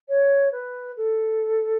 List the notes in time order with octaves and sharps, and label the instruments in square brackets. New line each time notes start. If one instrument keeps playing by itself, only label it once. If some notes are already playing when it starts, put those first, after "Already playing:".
[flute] C#5
B4
A4